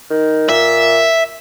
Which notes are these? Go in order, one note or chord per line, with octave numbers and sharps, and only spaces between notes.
D#3
A#2 E5